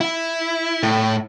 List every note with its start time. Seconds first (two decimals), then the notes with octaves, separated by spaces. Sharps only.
0.01 E4
0.83 A2